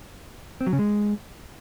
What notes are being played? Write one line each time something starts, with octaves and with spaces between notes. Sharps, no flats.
C4
F#3
C#3
G#3